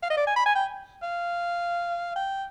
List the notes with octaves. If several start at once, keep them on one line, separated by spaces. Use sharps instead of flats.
F5
D#5
D5
G#5
B5
G#5
G5
F5
G5